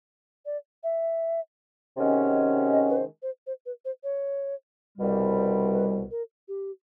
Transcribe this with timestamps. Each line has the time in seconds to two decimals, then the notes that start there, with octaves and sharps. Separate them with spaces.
0.46 D5
0.83 E5
1.96 C3 D#3 G#3 C#4 F#4
2.72 D#5
2.90 B4
2.97 C5
3.22 C5
3.47 C5
3.66 B4
3.85 C5
4.04 C#5
4.98 C2 B2 G3
5.73 B4
6.11 A#4
6.48 G4